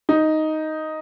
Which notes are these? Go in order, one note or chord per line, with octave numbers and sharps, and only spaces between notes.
D#4